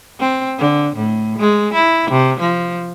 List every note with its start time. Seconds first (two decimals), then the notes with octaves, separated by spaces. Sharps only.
0.20 C4
0.58 D3
0.96 A2
1.38 G#3
1.73 E4
2.11 C3
2.40 F3